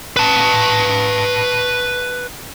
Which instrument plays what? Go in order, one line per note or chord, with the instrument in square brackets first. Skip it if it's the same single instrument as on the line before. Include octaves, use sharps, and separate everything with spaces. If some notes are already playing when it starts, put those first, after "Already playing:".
[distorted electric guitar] B4 A5